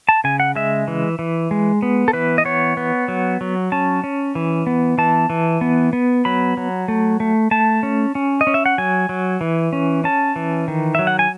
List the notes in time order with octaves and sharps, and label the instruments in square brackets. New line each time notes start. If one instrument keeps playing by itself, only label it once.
[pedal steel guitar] A5
C#3 G#5
F#5
G#3 E5
E3
E3
G#3
B3
A4
E3 B4
D#5
B3 C#5
B3
F#3
F#3
C#4 A5
C#4
E3
B3
E3 A5
E3
B3
B3
F#3 B5
F#3
A3
A3
A3 A5
C#4
C#4
D#5
C#4
E5
F#5
F#3 G#5
F#3
E3
C#4
C#4 A5
E3
D#3
F#3 E5
F#5
G#5